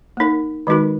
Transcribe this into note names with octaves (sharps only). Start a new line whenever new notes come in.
A#3 D#4 A#4
D#3 G#3 D#4 F#4 A#4